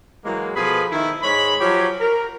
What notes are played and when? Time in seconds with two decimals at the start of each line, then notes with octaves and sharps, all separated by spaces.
0.24 E3 F#3 G#3 A#3
0.56 B2 F3 G#4 A4 B4 B5
0.91 D#3 E4
1.22 G#2 G#3 C#5 B5
1.60 F3 F#3 G4 C#5
2.00 A#4